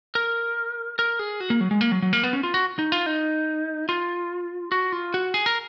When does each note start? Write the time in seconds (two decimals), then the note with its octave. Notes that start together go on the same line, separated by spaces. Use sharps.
0.15 A#4
0.99 A#4
1.19 G#4
1.40 F#4
1.50 A#3
1.61 F#3
1.71 G#3
1.81 A#3
1.92 F#3
2.02 F#3
2.13 A#3
2.24 B3
2.33 C#4
2.43 F4
2.54 F#4
2.79 D#4
2.92 F4
3.06 D#4
3.89 F4
4.72 F#4
4.92 F4
5.14 F#4
5.34 G#4
5.46 A#4